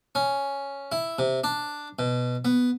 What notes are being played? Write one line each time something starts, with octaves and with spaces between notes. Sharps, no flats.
C#4
E4
C3
D4
B2
B3